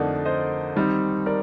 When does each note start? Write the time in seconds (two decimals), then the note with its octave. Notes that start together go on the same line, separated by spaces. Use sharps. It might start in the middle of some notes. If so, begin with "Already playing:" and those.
Already playing: F2 D3 A3 D#4 A#4 D5
0.25 C5 D#5
0.76 D#3 G3 C4 D#4
1.26 A#4 D5